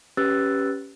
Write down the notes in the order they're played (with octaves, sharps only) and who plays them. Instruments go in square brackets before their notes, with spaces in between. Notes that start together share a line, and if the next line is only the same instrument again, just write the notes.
[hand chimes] C#4 G4 B4 E6 F#6 A6